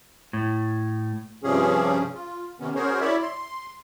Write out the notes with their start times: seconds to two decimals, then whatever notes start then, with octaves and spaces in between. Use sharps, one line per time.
0.33 A2
1.43 G2 C3 F3 C#4 G#4
2.14 F4
2.60 C3 D#3 B3 C#4
2.75 C#4 F#4 G#4 A#4 C5 C#5
3.00 E4 C#5 D5 E5
3.22 C6